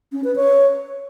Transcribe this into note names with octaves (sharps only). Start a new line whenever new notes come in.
C#4
B4
C#5